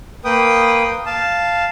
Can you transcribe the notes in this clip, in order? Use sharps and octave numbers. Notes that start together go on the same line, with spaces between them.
A#3 B4 G5 D#6
F5 A5